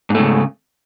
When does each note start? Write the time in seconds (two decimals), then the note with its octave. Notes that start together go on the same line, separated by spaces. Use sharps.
0.10 G#2
0.15 A3
0.19 C#3